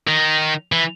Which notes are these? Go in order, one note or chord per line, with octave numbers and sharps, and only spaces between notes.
D#3
E3